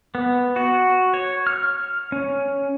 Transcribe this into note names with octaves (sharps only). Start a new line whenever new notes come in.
B3
F#4
C#5
F6
C#4